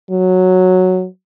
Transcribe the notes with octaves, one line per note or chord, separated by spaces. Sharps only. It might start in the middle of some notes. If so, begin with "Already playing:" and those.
F#3